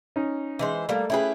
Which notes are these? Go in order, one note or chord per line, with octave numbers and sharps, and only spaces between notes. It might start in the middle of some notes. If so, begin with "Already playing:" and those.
C#4 D#4
E3 G#3 C5
G3 A3 A#3
A3 C#4 E4 G4 G#4 B4